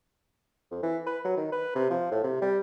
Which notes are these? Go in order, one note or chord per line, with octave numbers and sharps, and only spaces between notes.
F2
E3
B4
F#3
D#3
B4
C3
F3
A2
C3
G3